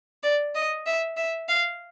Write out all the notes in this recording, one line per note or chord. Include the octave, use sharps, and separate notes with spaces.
D5
D#5
E5
E5
F5